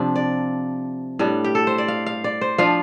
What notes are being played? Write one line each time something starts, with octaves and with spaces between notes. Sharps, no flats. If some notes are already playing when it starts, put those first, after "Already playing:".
Already playing: C3 F3 D4
D5
A2 G3 D4
G4
A4
C5
D5
F5
F5
D5
C5
F3 D4 F4 F5